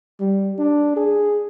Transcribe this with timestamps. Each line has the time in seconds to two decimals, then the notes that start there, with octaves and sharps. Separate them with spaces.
0.20 G3
0.59 D4
0.97 G#4